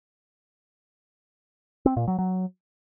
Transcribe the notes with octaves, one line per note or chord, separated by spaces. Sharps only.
C4
A#2
F#3
F#3